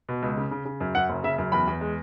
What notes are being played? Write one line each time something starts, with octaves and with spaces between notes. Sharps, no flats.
B2
C#2
C#3
C#3
C#3
F#2
F#2 F#5
F#1
C#3 E5
F#2
E2 B5
E2
G#3